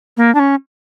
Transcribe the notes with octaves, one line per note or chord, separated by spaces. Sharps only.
A#3
D4
C#4